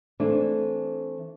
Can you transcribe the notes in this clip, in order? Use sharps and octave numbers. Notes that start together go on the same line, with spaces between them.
E3 A3 C4 D4